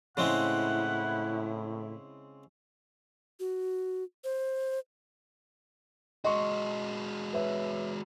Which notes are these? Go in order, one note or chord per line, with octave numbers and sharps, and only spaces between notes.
A2 C#3 G#3 C4 E4 F#5
F#4
C5
G#3 F#4 D#5 C6 C#6
B4 C#5 E5